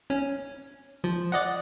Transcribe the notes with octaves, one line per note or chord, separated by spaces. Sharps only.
C#4
F3
D5 D#5 F#5